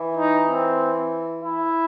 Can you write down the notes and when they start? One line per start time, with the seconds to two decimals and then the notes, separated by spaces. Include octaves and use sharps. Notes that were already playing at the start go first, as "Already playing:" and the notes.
Already playing: E3
0.17 D#4
0.48 C4
1.44 E4